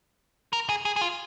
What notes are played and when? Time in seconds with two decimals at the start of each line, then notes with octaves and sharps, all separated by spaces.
0.53 A#4
0.69 G#4
0.85 G#4
0.96 G#4
1.01 F4